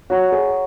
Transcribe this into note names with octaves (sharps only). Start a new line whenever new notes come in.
F#4 C#5 F#5 A#5 C#6
G#4